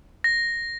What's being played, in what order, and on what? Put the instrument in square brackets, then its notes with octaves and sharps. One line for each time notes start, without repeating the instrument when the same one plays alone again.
[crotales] A#6